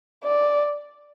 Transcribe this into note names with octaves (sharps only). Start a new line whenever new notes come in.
D5